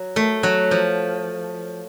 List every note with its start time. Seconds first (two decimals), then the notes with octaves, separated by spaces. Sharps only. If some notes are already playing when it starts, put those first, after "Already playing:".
Already playing: F#3
0.16 A3
0.43 F#3
0.71 F3